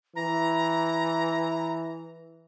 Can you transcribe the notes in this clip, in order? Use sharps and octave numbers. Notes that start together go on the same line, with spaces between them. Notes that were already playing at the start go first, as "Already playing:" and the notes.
E3 A#5